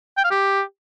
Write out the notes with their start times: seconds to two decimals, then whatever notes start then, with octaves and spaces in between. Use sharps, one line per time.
0.18 G5
0.24 F5
0.31 G4